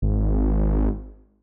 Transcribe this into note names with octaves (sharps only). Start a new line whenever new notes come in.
G#1